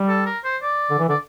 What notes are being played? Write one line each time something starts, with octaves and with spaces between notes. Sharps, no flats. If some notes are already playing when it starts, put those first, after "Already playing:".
Already playing: G3
A4
A#4
C5
D5
D3
E3
D3 D5